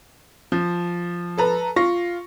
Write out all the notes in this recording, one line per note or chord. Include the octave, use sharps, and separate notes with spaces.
F3
A4 B4 A#5
F4 C#6 A#6